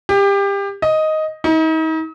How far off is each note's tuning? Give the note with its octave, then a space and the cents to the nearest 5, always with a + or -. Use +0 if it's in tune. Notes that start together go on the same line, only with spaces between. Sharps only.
G4 +25
D#5 +5
D#4 +40